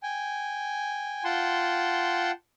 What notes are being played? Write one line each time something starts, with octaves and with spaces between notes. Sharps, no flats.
G5 G#5
F4 F#5 G5 A5 C6